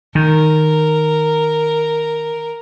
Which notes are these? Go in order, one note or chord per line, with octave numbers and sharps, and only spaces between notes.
D#3 A#4